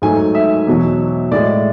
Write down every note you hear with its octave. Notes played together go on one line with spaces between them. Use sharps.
G#2 F#3 A3 G#5
E5
E2 B2 F#3
A2 G#3 D5